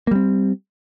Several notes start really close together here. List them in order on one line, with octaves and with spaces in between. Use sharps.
A#3 G3 C4